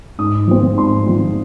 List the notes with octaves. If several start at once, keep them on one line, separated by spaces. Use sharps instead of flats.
G#2 D#6
F3 C4
G#2 C6
F3 C4